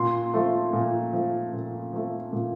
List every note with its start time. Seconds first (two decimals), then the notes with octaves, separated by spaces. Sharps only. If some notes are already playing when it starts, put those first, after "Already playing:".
Already playing: A#2 C6
0.34 F3 A3
0.73 A#2
1.13 F3 A3
1.53 A#2
1.93 F3 A3
2.33 A#2